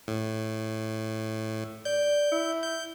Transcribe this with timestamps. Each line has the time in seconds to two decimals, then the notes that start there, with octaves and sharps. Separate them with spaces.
0.08 A2
1.85 D5 G6
2.32 E4
2.63 G6